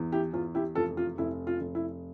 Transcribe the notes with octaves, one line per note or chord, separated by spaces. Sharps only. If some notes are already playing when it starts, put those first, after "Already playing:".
Already playing: E2 E3
E4 G4
E2 F4
E4 G4
F1 F4 A4
F4
F1 E4
F4
F1
E4